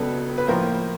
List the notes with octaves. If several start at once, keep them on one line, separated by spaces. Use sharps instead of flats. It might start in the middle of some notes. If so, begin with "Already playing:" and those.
Already playing: C#2 C#3 F#3 B3 D4 A4 B4
B4
A2 F3 A#3 A#4 C5